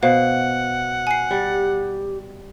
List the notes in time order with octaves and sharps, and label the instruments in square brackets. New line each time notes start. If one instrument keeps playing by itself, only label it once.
[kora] B2 [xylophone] C5 F5 [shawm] F#5
[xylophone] G#5 C7
[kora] G3 [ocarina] G4